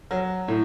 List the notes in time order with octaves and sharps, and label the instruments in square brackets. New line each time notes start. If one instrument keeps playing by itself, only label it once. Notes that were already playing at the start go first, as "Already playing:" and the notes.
[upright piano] F#3
A2